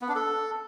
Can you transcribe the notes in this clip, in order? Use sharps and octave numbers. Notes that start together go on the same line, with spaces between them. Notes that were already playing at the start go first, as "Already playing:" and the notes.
B3
D4
A4